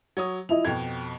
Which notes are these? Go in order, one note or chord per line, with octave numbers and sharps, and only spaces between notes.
F#3 C#5 D#6
F3 E4 D#5 F7
F2 B2 G5 G#6